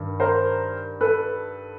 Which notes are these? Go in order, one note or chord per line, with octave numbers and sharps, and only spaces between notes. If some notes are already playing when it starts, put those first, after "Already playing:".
Already playing: G2 D#3
A#4 C5
A4 B4